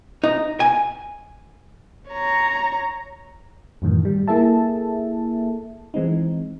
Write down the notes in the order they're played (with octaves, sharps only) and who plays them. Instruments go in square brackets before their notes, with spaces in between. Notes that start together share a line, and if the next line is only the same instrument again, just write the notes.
[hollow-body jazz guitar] D#4
G#5
[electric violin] C#5 A#5
[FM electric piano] F#2 A2 D#3 E3
G3
A#3 E4 G#4 A4 E5 A5
E3 G#3 C4 D#4